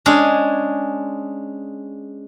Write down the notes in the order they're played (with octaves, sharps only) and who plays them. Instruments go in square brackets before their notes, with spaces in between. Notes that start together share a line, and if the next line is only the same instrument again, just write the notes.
[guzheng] G#3 C#4 D4 G#4